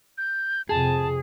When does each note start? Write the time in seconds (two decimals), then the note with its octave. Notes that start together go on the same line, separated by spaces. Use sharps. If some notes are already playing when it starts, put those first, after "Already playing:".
0.18 G6
0.69 F2 C3 G#4 A5